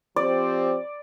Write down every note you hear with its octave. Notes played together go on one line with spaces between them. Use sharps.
F3 C4 G4 C5 D5